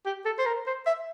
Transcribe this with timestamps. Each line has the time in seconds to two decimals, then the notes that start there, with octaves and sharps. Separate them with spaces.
0.06 G4
0.25 A4
0.38 C5
0.46 A#4
0.67 C5
0.86 E5